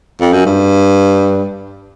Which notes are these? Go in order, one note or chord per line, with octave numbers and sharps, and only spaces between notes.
F2
F#2
G2